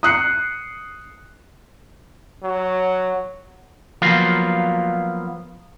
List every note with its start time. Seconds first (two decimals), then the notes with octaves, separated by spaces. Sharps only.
0.03 D#6 F#6 C7 C#7
2.43 F#3
4.02 F3 F#3 A#3 B3 F4 F#4